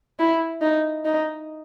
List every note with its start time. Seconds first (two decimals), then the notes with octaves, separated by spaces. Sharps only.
0.19 E4
0.62 D#4
1.05 D#4